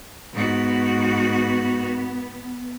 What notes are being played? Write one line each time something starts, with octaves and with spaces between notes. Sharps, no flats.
G#2 B3 F#4